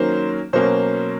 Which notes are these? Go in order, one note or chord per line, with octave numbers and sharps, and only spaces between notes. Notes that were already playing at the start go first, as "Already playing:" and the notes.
Already playing: D#3 F#3 A#3 C#4 C5
B2 F#3 A#3 C#4 C5